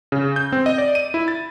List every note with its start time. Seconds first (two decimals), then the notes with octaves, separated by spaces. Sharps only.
0.12 C#3
0.36 G6
0.52 C4
0.66 D#5
0.78 D5
0.95 D#7
1.14 E4
1.28 A6